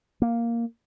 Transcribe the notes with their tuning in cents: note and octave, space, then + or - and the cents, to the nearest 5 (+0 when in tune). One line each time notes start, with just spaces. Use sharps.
A#3 +0